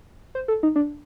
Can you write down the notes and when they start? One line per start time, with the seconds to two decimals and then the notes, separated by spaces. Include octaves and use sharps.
0.35 C5
0.48 A4
0.63 D#4
0.76 D4